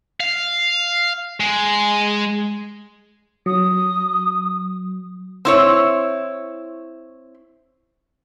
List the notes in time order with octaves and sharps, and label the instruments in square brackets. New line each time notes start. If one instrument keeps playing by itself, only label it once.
[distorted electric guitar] F5
G#3
[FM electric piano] F#3 [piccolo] D#6
[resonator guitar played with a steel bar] C4 E4 C#5